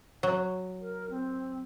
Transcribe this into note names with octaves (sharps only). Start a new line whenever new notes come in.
F#3
A#4
C4